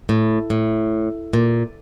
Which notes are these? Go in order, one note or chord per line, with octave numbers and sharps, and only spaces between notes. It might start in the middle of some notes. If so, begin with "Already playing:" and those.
A2
A2
A#2